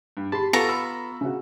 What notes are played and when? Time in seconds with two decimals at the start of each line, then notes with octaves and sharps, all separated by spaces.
0.17 G2
0.32 G4 A5 B5 C6
0.53 B3 F4 A4 A#5 C#6
0.69 B5 E6
1.21 C#3 F#4